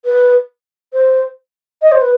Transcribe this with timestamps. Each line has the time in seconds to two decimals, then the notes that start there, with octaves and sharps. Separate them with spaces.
0.05 B4
0.93 C5
1.82 D#5
1.92 C5
2.01 B4